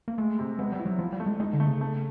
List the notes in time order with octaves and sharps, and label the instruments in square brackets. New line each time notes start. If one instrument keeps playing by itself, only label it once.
[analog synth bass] A#3
[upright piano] G#3 [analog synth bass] A3
[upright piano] C3
[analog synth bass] G#3 [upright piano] B3
[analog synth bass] G3
[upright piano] E4
[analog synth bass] F#3
[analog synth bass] F3 [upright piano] F4
[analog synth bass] G3
[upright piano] A3
[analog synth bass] G#3
[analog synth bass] G#3 [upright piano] D#4
[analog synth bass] D3
[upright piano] A3
[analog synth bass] C#3
[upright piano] A3